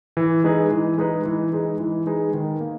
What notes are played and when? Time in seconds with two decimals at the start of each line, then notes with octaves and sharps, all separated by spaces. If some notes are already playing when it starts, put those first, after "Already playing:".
0.17 E3
0.44 G#3 D#4 G#4 B4
0.71 E3
0.98 G#3 D#4 G#4 B4
1.26 E3
1.53 G#3 D#4 G#4 B4
1.80 E3
2.07 G#3 D#4 G#4 B4
2.34 D#3
2.61 A#3